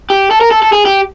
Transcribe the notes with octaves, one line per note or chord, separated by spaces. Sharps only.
G4
A4
A#4
A4
A4
G#4
G4